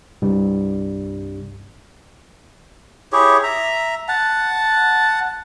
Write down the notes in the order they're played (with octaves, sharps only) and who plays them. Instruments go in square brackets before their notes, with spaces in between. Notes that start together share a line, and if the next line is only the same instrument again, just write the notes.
[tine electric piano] C2 G2 G3
[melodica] E4 G4 G#4 C#5
E5 A#5
F#5 A5